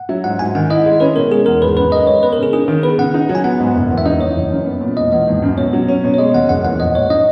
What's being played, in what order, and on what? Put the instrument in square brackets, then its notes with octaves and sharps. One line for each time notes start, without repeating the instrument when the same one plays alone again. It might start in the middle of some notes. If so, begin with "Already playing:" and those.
Already playing: [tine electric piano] F#5
[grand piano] F#3 [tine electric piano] E5
[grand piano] G#2 [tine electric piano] F#5
[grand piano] G#2 [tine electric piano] G#5
[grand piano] D#3 [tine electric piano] F#5
[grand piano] E4 [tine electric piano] D#5
[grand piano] G#3
[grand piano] C#4 [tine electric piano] B4
[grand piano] B2 [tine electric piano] A#4
[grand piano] G#3 [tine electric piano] G#4
[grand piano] E2 [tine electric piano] A#4
[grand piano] G#1 [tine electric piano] B4
[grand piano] F#2 [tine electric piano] B4
[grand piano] A#4 [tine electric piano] D#5
[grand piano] G#3 [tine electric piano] C#5
[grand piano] B3 [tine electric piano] B4
[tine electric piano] A#4
[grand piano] C#3 [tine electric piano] G#4
[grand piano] D#4 [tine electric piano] G#4
[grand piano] D#3
[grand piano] B3 [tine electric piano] B4
[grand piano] C#3 [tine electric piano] F#5
[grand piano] D#4
F#3
[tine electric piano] G#5
[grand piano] B3 [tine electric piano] F#5
[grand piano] G#2
F#1
E2
[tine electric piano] E5
[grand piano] D#4 [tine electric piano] D#5
[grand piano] E3 [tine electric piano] C#5
[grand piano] F#1
F#2
B3
A#2
[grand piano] E1 [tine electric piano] D#5
[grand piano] E2 [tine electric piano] D#5
[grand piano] G#1
F#2
[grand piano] B2 [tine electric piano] C#5
[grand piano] F#3
C#4
B2
[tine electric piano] C#5
[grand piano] G#3 [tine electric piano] D#5
[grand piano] D#2 [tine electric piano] F#5
[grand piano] F#1 [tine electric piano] F#5
[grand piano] E2 [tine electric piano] F#5
[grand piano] A#1 [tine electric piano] D#5
[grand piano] G#2 [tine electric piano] C#5
[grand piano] D#4 [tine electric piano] D#5